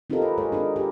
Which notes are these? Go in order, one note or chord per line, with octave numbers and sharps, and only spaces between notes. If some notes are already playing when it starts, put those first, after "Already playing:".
C4 D#4 F4 G4 A4 A#4
B4
G#3 G#4 C#5
D4 D#4 A#4
G4